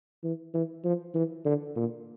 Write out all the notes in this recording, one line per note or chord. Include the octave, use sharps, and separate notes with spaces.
E3
E3
F3
E3
D3
A#2